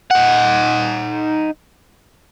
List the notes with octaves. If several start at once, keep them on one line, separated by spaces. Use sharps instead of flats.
D#4 F#5